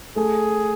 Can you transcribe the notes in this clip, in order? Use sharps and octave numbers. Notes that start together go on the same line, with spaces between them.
A3 G#4